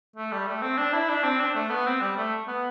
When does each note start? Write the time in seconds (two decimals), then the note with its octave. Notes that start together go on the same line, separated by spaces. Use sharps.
0.16 A3
0.32 G3
0.47 A3
0.62 C4
0.78 D4
0.93 E4
1.09 D4
1.24 C4
1.40 D4
1.55 A3
1.70 B3
1.86 C4
2.01 G3
2.17 A3
2.48 B3